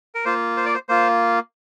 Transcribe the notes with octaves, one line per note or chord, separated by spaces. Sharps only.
A#4
A#3 F4 C5
C5
D5
C5
A#3 F4 C5